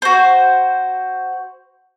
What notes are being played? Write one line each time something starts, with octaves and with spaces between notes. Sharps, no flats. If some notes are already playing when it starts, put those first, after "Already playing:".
F#4 C5